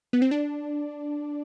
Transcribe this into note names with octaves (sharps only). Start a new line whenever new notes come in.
B3
C4
D4